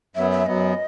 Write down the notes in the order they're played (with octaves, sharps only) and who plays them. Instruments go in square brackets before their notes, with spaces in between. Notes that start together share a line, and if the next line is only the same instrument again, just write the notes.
[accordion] F#2 F#3 B3 [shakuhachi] E5
[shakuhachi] E5
[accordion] F#2 F#3 B3 [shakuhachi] D#5